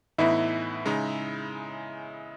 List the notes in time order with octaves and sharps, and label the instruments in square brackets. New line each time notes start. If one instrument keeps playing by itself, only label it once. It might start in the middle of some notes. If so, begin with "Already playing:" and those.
[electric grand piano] A2 E3 B3 D#4 [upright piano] E4
[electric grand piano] C#3 G#3 D#4